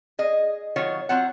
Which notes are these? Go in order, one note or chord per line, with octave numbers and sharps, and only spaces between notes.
G#4 D#5
D#3 F#3 F4 C#5
F#3 C4 F4 C#5 F#5